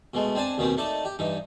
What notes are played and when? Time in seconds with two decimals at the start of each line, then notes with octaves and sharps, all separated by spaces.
0.14 B2 G#3 A3
0.35 C4 D4 G#5 A5
0.58 D#2 B2 D#3 C4 C#4
0.77 A3 D#4 D5 A5
1.05 G4
1.19 G2 E3 D#4